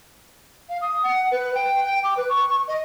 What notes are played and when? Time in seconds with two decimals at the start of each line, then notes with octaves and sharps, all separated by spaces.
0.69 F5
0.81 D#6
1.03 F#5
1.32 B4
1.54 G5
1.84 G5
2.04 D6
2.17 B4
2.29 C#6
2.49 C#6
2.68 D#5